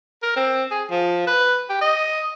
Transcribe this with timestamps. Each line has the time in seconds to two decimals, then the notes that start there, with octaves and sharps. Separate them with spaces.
0.23 A#4
0.36 C4
0.71 G#4
0.91 F3
1.27 B4
1.69 G4
1.81 D#5